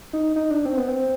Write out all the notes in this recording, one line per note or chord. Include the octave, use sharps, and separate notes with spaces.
D#4
D#4
D4
C4
B3
C4